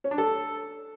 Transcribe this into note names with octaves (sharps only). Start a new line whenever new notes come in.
C#4
D4
A4